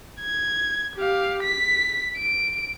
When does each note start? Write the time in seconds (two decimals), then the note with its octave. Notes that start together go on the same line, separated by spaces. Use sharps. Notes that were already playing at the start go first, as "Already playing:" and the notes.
0.21 G#6
0.96 G4 F5
1.44 B6
2.17 D7